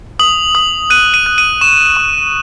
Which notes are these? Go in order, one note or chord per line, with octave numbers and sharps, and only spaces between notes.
D#6 F#7
D#6
F#6 D#7
D#7
F#6
D#7
C#6 E7
C#6